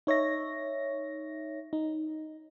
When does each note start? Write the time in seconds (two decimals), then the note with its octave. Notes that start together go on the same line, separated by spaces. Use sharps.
0.07 D#4 C#5 E5 A#6
1.73 D#4